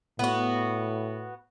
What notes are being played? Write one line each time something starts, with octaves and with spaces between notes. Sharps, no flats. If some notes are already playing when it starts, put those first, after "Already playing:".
A2 B3 F#4